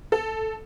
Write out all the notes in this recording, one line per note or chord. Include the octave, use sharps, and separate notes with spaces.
A4